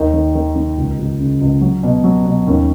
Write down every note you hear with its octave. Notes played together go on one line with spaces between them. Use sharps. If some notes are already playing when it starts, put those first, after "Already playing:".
Already playing: D#2 D#3 D#4
D#3
D#3
D#3
C#2
C#2
C#3
C#2
F#3
B2
F#3
B2
D#2 C#4